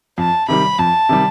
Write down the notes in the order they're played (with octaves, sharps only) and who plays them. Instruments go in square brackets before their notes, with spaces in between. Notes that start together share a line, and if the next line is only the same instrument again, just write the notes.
[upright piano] F2 [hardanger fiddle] A5
[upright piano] C3 D#3 G3 [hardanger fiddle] B5
[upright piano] F2 [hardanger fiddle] A5
[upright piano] C3 D#3 G3